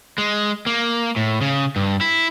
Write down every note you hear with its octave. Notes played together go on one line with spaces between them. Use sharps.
G#3
A#3
A2
C#3
G2
E4